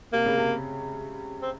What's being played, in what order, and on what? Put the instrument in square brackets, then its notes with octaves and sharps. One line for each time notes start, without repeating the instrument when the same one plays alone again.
[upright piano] C3 [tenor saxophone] A#3
[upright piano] C#3
C3
[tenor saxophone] C4